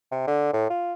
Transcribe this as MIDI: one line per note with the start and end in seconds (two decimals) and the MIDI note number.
0.12 0.23 48
0.27 0.49 50
0.53 0.66 45
0.70 0.94 65